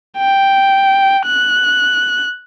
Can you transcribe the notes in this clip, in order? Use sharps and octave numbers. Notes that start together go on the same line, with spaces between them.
G5
F#6